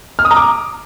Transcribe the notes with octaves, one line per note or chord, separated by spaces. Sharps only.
F6
D#6
A#5
D6